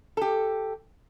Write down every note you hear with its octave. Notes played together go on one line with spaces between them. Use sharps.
G4 A4